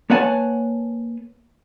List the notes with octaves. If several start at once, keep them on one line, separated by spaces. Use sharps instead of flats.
A#3 B4 C#5 F#5 G#5 A5